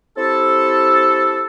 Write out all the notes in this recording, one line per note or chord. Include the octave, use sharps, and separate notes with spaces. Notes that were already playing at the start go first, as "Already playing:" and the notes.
C4 E4 G4 A4